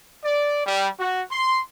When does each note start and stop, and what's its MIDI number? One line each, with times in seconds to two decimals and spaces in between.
0.25 0.62 74
0.66 0.88 55
1.00 1.22 66
1.31 1.61 84